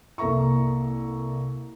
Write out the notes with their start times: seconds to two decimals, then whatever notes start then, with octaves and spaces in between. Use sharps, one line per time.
0.18 C2 A#3 A4 E5 A#5 C#6